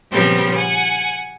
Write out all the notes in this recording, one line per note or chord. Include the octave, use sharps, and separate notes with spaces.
A#2 C#3 F3 G3 B3 C4
F#5 G#5